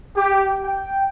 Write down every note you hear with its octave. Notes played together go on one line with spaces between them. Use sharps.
G4
G5